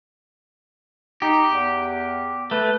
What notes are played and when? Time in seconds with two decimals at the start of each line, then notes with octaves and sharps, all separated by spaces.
1.22 D#4 G4
1.51 E2
2.51 A3 B4